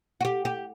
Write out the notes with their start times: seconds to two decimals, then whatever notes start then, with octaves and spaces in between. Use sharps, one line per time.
0.21 F#4
0.25 G4
0.45 G4